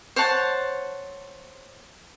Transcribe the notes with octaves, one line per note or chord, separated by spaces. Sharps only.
C5 C#5 F#5 A5